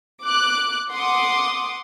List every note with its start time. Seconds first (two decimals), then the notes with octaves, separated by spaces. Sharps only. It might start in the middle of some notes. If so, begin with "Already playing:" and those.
0.23 D6 F#6
0.90 F#5 C6 D6 D#6